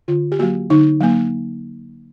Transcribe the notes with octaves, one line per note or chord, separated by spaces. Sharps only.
D3 F4
G4
F#3 A#3 F#4
D3 D#4
F#3 A#3